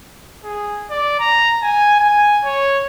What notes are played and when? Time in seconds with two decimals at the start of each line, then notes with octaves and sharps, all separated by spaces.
0.45 G#4
0.91 D5
1.20 A#5
1.62 G#5
2.00 G#5
2.45 C#5